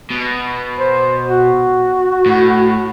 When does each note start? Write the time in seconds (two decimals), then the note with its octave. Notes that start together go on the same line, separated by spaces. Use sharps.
0.11 B2
0.78 C5
1.27 F#4
2.26 A2